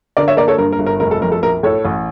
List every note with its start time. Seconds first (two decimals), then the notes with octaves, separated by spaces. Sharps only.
0.17 D3 A#4 D5
0.28 C#5 E5
0.37 A#3 A#4 D5
0.48 A4 C#5
0.58 G2 A#4
0.73 A#4
0.79 G1
0.86 A#4
1.00 F1 A#4
1.11 A4
1.22 F2 A#4
1.32 A4
1.43 A#1 A#4
1.63 A2 A4 C#5
1.85 A1